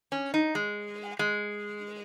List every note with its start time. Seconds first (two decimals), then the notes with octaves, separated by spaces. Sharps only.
0.12 C#4
0.34 D#4
0.55 G#3
1.19 G#3